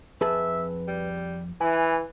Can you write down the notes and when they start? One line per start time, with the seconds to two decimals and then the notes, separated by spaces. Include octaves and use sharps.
0.21 F2 G#4 B4 E5 A5
0.88 G3
1.61 E3 E4 G#5